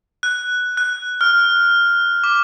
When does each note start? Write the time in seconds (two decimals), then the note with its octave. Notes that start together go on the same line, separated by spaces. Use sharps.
0.23 F#6
0.77 F#6
1.21 F6
2.24 D6